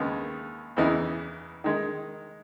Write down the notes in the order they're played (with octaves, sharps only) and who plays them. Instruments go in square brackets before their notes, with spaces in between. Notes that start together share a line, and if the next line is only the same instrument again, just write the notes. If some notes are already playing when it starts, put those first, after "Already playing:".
Already playing: [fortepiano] D#2 C#3 G#3 B3 D#4
E2 C#3 E3 B3 D#4
D#3 G#3 D#4